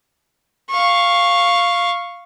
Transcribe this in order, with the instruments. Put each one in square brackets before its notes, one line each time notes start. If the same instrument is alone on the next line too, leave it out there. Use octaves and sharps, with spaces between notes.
[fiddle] F5 C#6